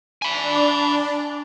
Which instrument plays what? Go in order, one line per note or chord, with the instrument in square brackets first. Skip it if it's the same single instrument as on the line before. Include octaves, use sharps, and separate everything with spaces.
[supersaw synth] D4 [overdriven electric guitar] G#5 B5